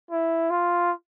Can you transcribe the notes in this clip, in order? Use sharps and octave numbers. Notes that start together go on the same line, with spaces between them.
E4
F4